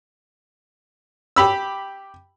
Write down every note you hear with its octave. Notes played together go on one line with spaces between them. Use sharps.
G4 B5 E6